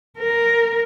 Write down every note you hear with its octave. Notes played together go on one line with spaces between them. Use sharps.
A#4